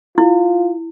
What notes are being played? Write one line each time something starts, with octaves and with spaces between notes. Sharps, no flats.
E4 F4